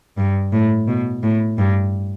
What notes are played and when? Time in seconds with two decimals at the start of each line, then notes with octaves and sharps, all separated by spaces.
0.17 G2
0.52 A2
0.88 B2
1.23 A2
1.58 G2